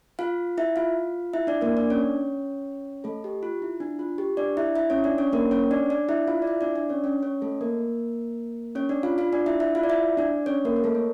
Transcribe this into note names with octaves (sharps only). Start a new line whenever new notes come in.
F4 F5
E4 E5
F4 F5
E4 E5
D4 D5
A#3 A#4
D4 D5
C#4 C#5
A3 A4
G4
F4
E4
D4
F4
G4
D4 D5
E4 E5
E4 E5
C#4 C#5
D4 D5
C#4 C#5
A#3 A#4
C#4 C#5
D4 D5
D4 D5
E4 E5
F4 F5
D5
E4 E5
D4 D5
D4 D5
C#4 C#5
C#4 C#5
C#4 C#5
A3 A4
A#3 A#4
C#4 C#5
D4 D5
F4 F5
F4 F5
D4 D5
E4 E5
E4 E5
F4 F5
D5
E4 E5
D4 D5
C#4 C#5
A#3 A#4
A#4
A3 A4
C#5